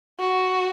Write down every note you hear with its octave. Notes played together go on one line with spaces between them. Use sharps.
F#4